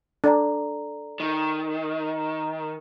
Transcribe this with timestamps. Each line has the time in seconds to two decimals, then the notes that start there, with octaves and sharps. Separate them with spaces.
0.24 D4 A4 D5 A#5
1.20 D#3